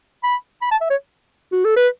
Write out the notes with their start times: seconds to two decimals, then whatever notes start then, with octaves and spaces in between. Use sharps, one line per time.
0.24 B5
0.62 B5
0.71 A5
0.81 E5
0.90 C#5
1.52 F#4
1.65 A4
1.76 B4